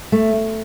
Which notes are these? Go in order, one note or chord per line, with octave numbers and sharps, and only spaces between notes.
A3